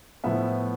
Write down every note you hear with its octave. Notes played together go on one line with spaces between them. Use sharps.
A2 F3 B3 E5